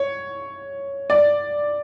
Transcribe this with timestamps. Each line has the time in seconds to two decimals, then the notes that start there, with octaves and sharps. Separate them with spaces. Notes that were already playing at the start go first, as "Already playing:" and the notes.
Already playing: C#5
1.10 D5